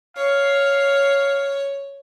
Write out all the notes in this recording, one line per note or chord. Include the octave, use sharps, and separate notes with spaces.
C#5 F5